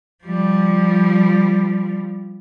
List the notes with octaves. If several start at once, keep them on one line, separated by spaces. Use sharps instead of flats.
F3 G3